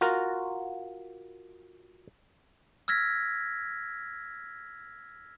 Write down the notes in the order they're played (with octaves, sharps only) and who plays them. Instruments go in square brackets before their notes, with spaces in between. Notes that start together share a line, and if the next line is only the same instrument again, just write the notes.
[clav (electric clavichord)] F4 F#4 A#4
[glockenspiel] E6 F6 G#6 A#6 B6